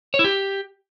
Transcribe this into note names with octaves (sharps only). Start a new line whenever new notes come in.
C#5
E4
G4